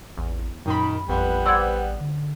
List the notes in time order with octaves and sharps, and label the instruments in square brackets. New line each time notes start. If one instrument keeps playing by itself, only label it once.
[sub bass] A1 [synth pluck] E2
[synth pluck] F#2 B5 [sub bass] A#2 [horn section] D#3
[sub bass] A1 [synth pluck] F2 [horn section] G3 B3 B4
[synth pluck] C5 D5 F#5 [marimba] E6 G#6
[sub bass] D3